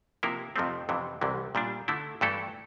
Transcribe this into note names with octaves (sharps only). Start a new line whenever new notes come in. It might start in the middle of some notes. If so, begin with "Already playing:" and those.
C3 F3 A#3 E4 A#4
F2 C3 F3 A3 C4
F2 C3 E3
C2 C3 E3
A#2 G3 D4
D3 A3 E4
G2 E3 A3 E4 A4